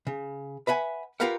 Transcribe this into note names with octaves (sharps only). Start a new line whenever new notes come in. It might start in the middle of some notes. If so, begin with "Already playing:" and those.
C#3
B4 E5 F#5 G#5
F4 G4 A#4 B4 F5 F#5